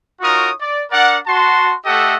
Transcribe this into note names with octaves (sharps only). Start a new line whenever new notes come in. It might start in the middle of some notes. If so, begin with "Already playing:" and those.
D#4 F4 F#4 A#4 C#5 D#6
D5
D4 A#4 D5 F#5
F#4 A5 C6
A3 G4 A4 D#5 E5 F#5